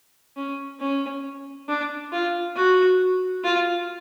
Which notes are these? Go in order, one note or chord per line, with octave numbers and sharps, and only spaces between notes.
C#4
C#4
D4
F4
F#4
F4